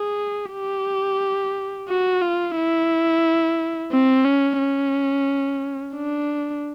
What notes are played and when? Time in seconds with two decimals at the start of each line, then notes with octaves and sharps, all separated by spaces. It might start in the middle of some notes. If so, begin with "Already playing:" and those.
Already playing: G#4
0.53 G4
1.89 F#4
2.22 F4
2.56 E4
3.92 C4
4.25 C#4
4.59 C#4
5.94 D4